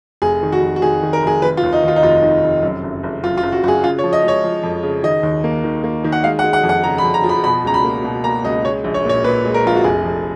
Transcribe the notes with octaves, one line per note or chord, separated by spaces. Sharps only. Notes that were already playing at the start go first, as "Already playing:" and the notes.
F1 G#4
D#3
F#4
F1
F#4
D#3 G#4
D#3
A#4
F1 G#4
D#3 B4
F4
D#2
D#4
D#3 F4
D#4
F1 F4
D#3
F1
F#2
F#1
F#1
F#1 F4
F4
F#1
F#4
F#1 F#4 G#4
C#3 F4
C#5
F3
D#5
G#3 C#5
F3
F2
C#3
D#3 D#5
D#2
A#3
D#3
A#3
D#3
F#5
G#3 F5
F#5
G#3
F#5
F2
F#5
C#3 A#5
B5
F2
A#5
F3
B5
B2 B5
C#2 A#5
B5
A#3
B2
A#3 A#5
C#2 D#5
G#3 C#5
A#1
C#5
A#2 C#5
A#2 B4
G#3
A#4
A#1 F4
F#4
F1 G#4
F2